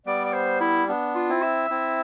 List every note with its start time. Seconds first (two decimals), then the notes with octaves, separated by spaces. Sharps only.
0.06 G3 B3 D5
0.25 D5
0.33 C5
0.61 E4
0.88 B3 D4
1.15 F4
1.29 C4 E4
1.42 E5
1.70 C4 E4